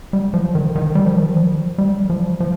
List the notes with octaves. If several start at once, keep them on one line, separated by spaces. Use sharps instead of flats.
G3
F3
D#3
D#3
G3
F3
D#3
F3
G3
F3
F3